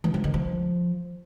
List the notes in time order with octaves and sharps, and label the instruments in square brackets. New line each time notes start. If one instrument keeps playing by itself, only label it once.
[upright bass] E3
F3
D#3
F3